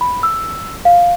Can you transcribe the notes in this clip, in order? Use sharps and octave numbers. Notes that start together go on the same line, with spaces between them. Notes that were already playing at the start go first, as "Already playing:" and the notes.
B5
E6
F5